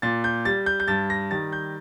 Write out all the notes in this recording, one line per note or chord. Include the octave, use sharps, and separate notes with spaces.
A#2 A6
G6
G3 A6
G6
G6
G2 A6
A#6
D#3 G3 A6
G6